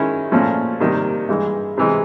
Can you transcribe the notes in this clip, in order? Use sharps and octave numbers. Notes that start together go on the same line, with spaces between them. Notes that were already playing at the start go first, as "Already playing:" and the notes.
Already playing: D#3 G#3 C#4 E4
A#2 F3 A3 C#4
C3 D#3 G3 A#3
G2 E3 G#3
C3 E3 G#3